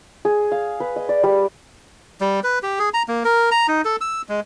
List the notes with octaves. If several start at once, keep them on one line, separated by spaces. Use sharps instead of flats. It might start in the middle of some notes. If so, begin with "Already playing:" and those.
G#4
F5
B4
D#5
D5
G3
G3
B4
G4
G#4
A#5
A#3
A#4
A#5
D#4
A4
E6
G#3